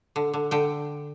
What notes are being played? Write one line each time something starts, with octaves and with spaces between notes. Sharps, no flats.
D3
D3
D3 G5